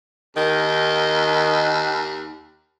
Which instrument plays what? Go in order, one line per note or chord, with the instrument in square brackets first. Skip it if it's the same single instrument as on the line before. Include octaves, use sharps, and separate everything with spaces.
[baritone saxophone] D#2 [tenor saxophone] D#3